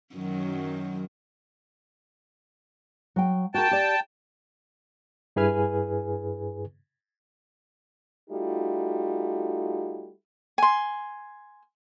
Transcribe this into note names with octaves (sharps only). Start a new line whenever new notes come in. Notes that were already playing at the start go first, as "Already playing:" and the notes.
F#2 D#3 F#3
F#3 G5
F#4 A#4 G5 A5
G4 D5
G2 E4 G#4 B4 G#5 F6
G3 A3 D#4 F4 F#4
G#5 C6